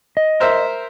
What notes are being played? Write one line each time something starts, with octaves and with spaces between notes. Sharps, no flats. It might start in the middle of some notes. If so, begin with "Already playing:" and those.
D#5
A#4 C5 E5